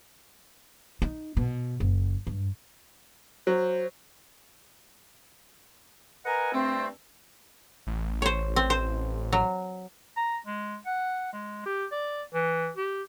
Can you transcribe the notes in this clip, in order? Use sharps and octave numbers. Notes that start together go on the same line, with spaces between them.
D#4
B2
F#1
G2
F#3 C5
A#4 B4 D#5 F#5 G#5 A#5
G2 A3 C4
A1
C5 C#5
C4
C5
F#3
A#5
G#3
F#5
G#3
G4
D5
E3
G4